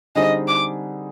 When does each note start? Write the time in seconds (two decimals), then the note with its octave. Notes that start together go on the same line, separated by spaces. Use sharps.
0.15 D3 G3 C4 D#4 G#4 D#5
0.48 D6